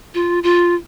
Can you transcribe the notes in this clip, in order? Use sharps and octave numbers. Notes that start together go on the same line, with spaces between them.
F4
F4